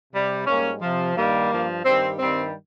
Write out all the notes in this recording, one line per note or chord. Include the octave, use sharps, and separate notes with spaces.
C3 G3
G#2 G3 A#3 C#4
C3 F3
G2 D#3 G3 A#3
G2 F3
G2 D#3 G3 C4
G2 D#3 G3 C4